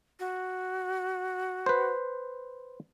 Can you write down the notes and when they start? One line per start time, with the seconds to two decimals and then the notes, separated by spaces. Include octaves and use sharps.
0.19 F#4
1.66 B4 C5